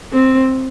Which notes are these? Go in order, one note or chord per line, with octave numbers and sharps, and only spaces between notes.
C4